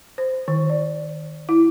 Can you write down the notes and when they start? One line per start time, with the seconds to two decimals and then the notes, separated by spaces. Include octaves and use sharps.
0.18 C5
0.48 D#3
0.69 D5
1.49 E4